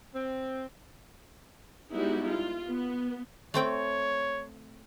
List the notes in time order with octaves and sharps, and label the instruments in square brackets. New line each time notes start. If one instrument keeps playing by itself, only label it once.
[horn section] C4
[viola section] G3 G#3 B3 D#4 E4 F#4
F4
B3
[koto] A3 C4 G5 [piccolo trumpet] C#5